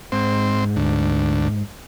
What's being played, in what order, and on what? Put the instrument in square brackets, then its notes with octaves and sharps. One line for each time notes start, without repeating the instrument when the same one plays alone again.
[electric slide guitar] G#2 [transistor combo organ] C4
[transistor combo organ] D2